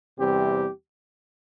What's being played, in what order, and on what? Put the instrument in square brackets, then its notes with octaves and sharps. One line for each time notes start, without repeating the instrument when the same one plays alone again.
[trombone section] E2 C3 G3 C4 G4